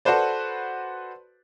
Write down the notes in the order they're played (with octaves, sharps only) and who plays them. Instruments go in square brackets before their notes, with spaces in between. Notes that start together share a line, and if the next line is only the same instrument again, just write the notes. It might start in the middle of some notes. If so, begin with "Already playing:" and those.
[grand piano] F#4 A4 B4 C5 D5